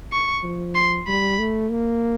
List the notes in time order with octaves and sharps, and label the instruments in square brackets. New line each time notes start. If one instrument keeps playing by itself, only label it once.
[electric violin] C#6
[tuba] F3
[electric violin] C6
[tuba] G3 [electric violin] B5
[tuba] A3
A#3